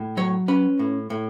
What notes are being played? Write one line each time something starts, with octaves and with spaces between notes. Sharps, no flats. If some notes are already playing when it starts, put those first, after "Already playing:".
Already playing: A2
F#3 C#5
C#4 B4
A2
A2